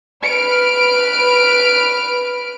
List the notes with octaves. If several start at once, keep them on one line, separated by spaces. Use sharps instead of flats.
B4 F6 D7